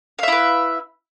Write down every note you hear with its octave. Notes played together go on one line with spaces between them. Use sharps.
E4 B4 E5 F5